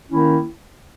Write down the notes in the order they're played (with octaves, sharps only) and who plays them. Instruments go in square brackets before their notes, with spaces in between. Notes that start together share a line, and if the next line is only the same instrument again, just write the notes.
[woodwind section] D#3 A#3 C#4 E4